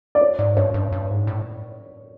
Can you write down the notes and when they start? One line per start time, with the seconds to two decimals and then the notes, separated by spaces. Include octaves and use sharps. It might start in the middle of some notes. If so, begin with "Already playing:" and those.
0.15 D5
0.21 C#5
0.39 G#2
0.57 G2 C#5
0.74 G2
0.92 G2
1.10 G#2
1.27 A2